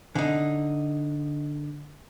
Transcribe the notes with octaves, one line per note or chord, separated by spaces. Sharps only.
D3 D#4